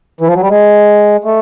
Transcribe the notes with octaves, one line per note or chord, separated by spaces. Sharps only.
E3
F3
F#3
G3
G#3
A3